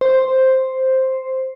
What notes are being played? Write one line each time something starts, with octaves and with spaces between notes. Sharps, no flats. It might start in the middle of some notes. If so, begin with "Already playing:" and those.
C5